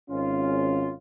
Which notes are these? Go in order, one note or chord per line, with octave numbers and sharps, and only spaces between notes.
G#1 C#4 F4